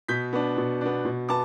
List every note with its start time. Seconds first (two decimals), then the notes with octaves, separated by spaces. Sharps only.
0.08 B2 G6 B6
0.33 B3 D4
0.57 B2
0.81 B3 D4
1.05 B2
1.29 B3 A5 D6